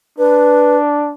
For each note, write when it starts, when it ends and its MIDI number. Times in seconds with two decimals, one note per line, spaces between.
0.18 1.14 62
0.18 0.77 71